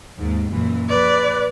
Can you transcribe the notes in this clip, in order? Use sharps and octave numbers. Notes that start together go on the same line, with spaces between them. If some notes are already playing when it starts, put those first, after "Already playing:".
D#2 G#2
F#2 A#2 E3
A#1 B4 D5